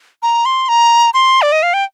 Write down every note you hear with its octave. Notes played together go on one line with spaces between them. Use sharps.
A#5
C6
A#5
C6
D5
D#5
F5
G5